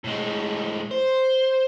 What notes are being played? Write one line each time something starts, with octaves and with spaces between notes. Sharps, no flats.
A2 G#3
C5